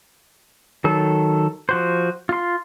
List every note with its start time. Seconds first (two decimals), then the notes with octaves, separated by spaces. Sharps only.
0.84 D#3 F#3 A4
1.69 F3 F#4 C5
2.29 F4 C6